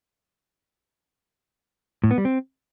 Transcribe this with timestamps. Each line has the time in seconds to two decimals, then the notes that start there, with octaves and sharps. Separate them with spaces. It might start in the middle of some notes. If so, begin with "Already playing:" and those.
2.04 A2
2.11 B3
2.18 G3
2.25 C4